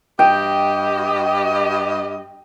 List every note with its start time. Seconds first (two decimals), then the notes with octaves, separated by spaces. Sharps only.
0.19 G2 G4 D#5 G5